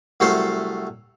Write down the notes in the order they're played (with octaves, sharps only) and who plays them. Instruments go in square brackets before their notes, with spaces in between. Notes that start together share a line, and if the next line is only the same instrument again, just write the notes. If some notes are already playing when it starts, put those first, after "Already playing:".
[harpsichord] C2 F#3 A3 A4 C5 F5